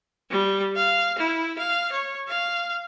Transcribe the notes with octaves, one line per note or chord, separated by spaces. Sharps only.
G3
F5
E4
F5
C#5
F5